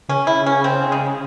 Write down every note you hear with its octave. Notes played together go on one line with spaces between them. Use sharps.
C#3 C#4
E4
C#4
C4
G#3